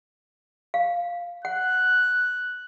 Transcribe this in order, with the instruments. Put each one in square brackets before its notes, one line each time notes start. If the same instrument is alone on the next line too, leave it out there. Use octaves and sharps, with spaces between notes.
[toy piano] F5
[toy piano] F#5 [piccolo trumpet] F#6